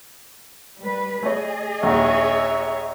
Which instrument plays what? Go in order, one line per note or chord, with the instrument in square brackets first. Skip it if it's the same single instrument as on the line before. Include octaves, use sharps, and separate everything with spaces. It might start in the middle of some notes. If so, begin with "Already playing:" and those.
[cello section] G3 B4
[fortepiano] A3 C#5 [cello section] G#4 D#5
[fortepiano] A#1 D#2 [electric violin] C#5 E5